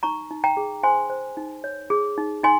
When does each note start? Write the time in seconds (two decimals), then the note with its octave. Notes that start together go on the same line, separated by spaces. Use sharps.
0.03 D#4 A#5 C#6
0.31 D#4
0.44 G5 A#5
0.57 G#4
0.83 C5 G#5 C6
1.10 C5
1.37 D#4
1.64 C#5
1.90 G#4
2.18 D#4
2.43 D#4 G#5 C6